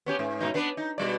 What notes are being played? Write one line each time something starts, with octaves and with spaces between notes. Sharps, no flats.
B3 C#4 G4
G#2
G#2 B2 D#4
B3 D4 B4
D#4
B2 G3 D5